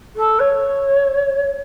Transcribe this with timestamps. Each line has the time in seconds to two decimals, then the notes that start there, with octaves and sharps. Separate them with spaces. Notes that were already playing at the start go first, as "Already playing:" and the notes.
0.16 A4
0.39 C#5